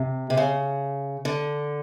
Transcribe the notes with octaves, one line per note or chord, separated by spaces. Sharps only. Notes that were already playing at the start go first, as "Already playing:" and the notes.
Already playing: C3
C3
C#3
D3